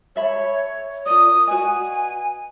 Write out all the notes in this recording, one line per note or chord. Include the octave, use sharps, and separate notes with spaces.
A4 C#5 E5 B5
F4 A#4 D5 D#6
F#4 B4 D#5 G#5